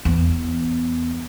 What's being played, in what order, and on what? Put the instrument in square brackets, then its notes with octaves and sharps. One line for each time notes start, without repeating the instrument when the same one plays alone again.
[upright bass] E2 B3